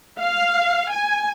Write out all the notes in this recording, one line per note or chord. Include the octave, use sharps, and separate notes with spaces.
F5
G#5